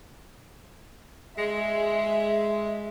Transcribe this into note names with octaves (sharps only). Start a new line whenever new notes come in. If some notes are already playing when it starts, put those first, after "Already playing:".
G#3 E5